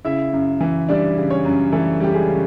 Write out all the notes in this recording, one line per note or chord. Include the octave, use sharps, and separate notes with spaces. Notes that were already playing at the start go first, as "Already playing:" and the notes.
C#3 E4 E5
F#2
E3
G3 D4 D5
C#3
C#4 C#5
F#2
E3 A3 A4
G3 G4
G#3 G#4
C#3